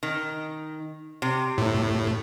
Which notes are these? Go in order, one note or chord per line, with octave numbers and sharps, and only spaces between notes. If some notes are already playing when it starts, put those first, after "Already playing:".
D#3
C3
A2